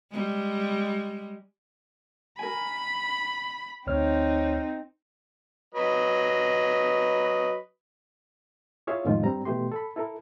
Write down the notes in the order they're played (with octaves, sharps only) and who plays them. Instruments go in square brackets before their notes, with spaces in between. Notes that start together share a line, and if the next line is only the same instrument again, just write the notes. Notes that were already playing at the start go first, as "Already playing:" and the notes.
[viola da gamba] G3 G#3
[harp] A#4 G#5 [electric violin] B5
[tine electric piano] D2 C#5 F6 [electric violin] C4 D#4
[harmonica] F#3 B4 D#5
[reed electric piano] E4 F4 G#4 C#5 E5 F5
F2 A2 D#3 F3 G#3 F4
G2 G3 C4 A#5
B2 E3 A3 G4 C6
A4 B5
E4 A4 A#4